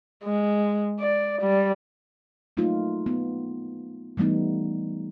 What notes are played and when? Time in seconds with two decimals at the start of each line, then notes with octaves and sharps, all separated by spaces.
0.24 G#3
1.00 D5
1.41 G3
2.57 F#3 A3 A#3 D#4 F4
3.06 B3
4.17 E3 G3 A3 B3 D#4